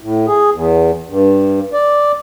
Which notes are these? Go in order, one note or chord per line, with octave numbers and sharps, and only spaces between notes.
A2
G#4
E2
G2
D5